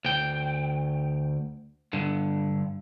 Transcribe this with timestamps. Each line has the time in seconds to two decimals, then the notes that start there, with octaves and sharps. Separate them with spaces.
0.05 D2 G5
1.93 G2 D3